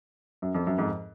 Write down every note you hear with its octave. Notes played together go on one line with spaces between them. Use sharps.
F#2
F2
F#2
F2 G#2